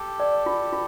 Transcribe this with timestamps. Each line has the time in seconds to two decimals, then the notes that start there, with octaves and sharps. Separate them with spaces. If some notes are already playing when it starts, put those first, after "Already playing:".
Already playing: G4 A4
0.20 D5
0.46 F4
0.73 F4